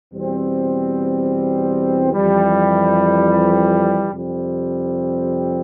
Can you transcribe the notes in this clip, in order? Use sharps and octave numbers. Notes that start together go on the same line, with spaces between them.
E2 B2 G3 C4
F2 E3 G3
F2 C3 G3 C4